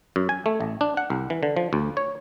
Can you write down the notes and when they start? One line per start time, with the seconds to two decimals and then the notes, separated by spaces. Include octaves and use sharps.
0.16 F#2
0.29 G#5
0.46 A3
0.61 A1
0.81 D4
0.97 F#5
1.10 C2
1.30 E3
1.43 D3
1.57 F3
1.73 D2
1.97 C#5